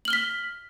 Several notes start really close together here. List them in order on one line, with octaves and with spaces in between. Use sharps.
F#7 F6 G7 B6